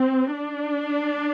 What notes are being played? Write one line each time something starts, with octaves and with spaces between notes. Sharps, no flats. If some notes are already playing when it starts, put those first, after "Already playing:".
Already playing: C4
D4